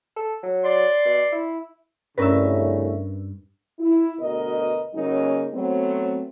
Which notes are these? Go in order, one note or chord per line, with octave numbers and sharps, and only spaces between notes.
A4
F#3
D5 C6
B2
E4
C2 G2 C#3 A3 C#4 A#4 B4 E6
E4
D2 B2 A#4 D#5
C#3 F#3 A#3 C#4 D#4 A#4
F#3 A3 B3 C4